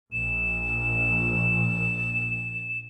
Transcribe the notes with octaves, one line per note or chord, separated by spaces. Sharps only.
A#1 A#2 E7